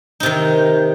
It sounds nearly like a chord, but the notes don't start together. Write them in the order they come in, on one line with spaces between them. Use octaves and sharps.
D#4 C3 D#3